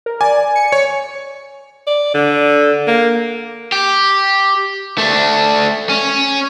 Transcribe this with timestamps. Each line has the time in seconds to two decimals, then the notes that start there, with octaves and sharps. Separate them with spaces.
0.06 A#4
0.21 D5 G#5
0.56 C#7
0.72 C#5
1.87 D5
2.14 D3
2.87 A#3
3.72 G4
4.98 A3 D4
5.90 C#4